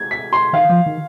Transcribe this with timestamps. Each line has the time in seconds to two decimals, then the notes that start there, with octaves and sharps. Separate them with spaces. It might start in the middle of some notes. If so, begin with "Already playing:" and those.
Already playing: G#6
0.11 B6
0.33 C6
0.53 D#3 F5
0.69 F3
0.86 D#3